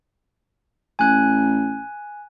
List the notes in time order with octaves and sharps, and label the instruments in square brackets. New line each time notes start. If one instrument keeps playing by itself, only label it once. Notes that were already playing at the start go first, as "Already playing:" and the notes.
[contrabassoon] A1 [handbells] G#5 F#6